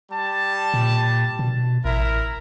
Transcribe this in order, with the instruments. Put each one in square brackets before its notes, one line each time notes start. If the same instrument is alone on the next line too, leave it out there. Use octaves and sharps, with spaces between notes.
[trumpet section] G3 A5
[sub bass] A#2
B2
[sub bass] A1 [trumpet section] E4 A#4 E5